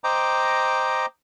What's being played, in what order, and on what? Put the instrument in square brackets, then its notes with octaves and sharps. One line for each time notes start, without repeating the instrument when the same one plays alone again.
[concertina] C5 D#5 G5 A#5 D6